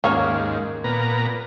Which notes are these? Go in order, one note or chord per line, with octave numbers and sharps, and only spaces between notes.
D#2 G#2 C#3 A#3 C#4 D#4 C#5
A#2 B3 A#5